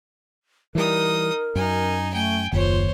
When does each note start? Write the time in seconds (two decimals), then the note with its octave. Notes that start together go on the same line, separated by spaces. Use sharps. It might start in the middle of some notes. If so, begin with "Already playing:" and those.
0.75 E3 G3 D#4 A#4 D#6
1.55 F#2 D#4 G#5
2.13 A3 G5 G#5
2.53 F#1 D#2 F4 C5 C#5